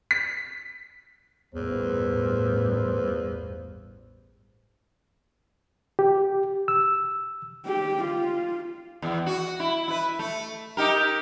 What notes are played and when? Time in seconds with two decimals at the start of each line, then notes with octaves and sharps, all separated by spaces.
0.11 B6
1.55 A1 E2 G2 A#2 B4 C5
5.99 G4
6.68 E6
7.66 G4
8.04 F4
9.02 E2
9.26 F#4
9.60 E4
9.88 E4 B4
10.19 A3
10.77 D#4 G4 A#4